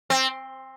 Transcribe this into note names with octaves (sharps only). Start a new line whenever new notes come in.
C4